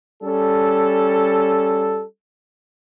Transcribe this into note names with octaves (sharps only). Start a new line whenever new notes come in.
G3 C#4 A4